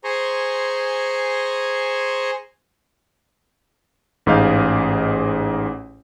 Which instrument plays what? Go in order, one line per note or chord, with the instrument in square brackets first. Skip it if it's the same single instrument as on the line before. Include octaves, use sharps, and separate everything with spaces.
[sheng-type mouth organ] G#4 C5 G#5 A#5 C6 C#6
[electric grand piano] A1 G#2 G#4 D#5 F5 G6